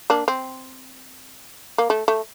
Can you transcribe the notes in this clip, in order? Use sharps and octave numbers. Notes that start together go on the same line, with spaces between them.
A#3 D4
C4
A#3
A3
A3